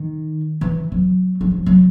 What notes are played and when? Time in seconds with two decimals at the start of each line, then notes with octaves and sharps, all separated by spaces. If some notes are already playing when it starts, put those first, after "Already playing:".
Already playing: D#3
0.61 E3
0.92 F#3
1.41 F#3
1.51 F3
1.66 F#3